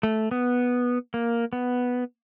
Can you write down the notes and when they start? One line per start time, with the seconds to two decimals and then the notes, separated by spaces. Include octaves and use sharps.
0.03 A3
0.31 B3
1.14 A#3
1.53 B3